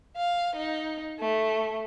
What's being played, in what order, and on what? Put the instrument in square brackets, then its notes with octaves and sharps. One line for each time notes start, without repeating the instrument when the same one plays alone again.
[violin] F5
D#4
A3